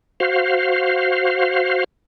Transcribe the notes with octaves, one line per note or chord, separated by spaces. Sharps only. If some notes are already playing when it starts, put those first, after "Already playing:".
F#4 C5 F5